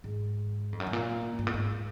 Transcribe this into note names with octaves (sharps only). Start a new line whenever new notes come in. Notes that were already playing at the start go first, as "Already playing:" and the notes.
G#2
F2
F#2
G#2
A#2
G#2
A#2
G#2